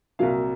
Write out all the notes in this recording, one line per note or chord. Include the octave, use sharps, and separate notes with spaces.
C2 A#2 F#3 A#3 F5